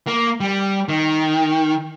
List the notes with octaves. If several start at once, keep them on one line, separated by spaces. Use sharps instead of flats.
A#3
G3
D#3